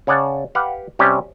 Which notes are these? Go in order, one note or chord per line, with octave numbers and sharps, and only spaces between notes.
C#3 C#5 D5 F#5 A5
G4 B4 F5 F#5
C3 G3 C#4 G4